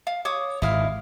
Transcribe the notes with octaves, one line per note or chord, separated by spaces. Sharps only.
F5
C#5 D6 D#6
G#1 E4 D#5 F5